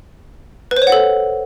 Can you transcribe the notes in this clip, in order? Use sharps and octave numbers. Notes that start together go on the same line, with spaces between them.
B4
C5
C#5
F#5
A4